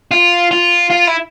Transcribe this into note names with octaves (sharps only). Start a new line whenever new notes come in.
F4
F4
F4
E4